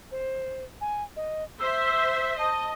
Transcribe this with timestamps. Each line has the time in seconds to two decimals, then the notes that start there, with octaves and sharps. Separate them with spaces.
0.12 C5
0.81 G#5
1.16 D#5
1.60 C5 E5 E6
2.39 D#5 A5